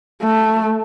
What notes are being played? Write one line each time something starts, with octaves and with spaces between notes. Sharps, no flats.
A3